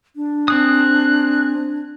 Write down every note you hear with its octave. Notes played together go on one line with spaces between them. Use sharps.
D4
C4 G#4 D#6 F#6